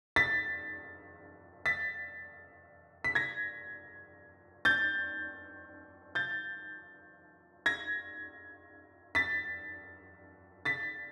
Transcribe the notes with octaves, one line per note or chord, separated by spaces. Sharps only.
A6 B6
A6 B6
B6
G#6 A#6
G6 A6
G6 A6
G#6 A#6
A6 B6
A6 B6